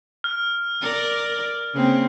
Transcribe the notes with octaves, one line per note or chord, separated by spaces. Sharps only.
F6
A#4 D5
C#3 A#3 C4